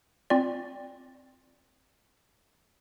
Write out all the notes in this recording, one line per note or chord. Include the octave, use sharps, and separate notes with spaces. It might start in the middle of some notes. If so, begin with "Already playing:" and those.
C4 F4 D5